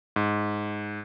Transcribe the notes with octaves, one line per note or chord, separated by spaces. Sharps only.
G#2